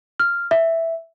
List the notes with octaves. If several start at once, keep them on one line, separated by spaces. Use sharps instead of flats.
F6
E5